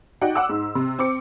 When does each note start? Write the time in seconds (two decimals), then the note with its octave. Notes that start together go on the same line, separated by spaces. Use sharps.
0.21 D#4 F#4 D5 F#5 G5
0.35 F#5 D6 E6
0.49 G#2
0.75 C3
0.99 C4 D6 C#7